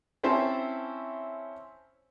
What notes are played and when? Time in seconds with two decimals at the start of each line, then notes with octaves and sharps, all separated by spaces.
0.23 C4 C#4 E4 C5 E5 A5